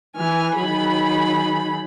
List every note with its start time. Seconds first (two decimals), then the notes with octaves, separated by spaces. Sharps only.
0.16 E3 G#5 F6
0.56 D#3 F#3 G#4 B5